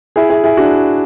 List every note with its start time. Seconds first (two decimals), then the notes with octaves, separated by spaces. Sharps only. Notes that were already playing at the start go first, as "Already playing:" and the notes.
0.16 E4 G#4
0.30 E4 G#4
0.44 E4 G#4
0.57 D4 F#4